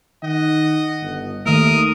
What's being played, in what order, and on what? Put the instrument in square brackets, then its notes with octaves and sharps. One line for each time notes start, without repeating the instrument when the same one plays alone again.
[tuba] D#3 [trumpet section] D#5 F#5
[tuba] G1
[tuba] D#2 [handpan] D#3 A3 [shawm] A#4 [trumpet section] D#6